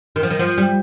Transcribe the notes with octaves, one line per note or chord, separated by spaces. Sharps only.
D#3
F3
D#3
F3
G3